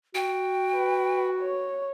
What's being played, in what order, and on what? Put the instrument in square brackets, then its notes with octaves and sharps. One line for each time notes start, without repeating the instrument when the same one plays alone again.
[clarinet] F#4 [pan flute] G5
[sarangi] B4
C#5